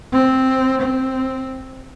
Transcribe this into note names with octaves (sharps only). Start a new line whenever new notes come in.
C4
C4